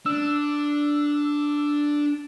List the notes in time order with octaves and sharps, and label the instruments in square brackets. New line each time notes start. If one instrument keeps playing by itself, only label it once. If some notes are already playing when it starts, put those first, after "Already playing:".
[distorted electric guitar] D4 [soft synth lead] E6